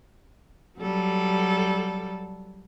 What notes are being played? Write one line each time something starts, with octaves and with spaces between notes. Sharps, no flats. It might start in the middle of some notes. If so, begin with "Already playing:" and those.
F#3 G3 A4